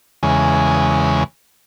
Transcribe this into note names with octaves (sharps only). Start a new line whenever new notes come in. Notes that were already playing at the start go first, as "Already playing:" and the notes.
E2 C#3 G#3